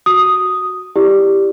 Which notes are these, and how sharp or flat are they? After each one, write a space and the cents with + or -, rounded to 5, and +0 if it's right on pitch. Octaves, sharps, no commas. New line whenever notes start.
F#4 +0 D#6 +0
E4 +0 G4 +0 D5 +0